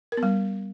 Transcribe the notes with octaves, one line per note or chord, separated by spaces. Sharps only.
A#4
B3
G3